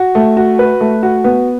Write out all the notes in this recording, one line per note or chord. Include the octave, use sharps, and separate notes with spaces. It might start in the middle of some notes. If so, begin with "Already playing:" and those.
Already playing: F#4
A3
F#4
B4
A3
F#4
B3